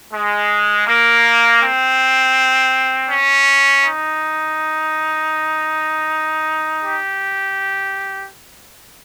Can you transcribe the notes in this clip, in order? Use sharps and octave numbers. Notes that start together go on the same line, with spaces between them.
G#3
A#3
C4
C#4
D#4
G4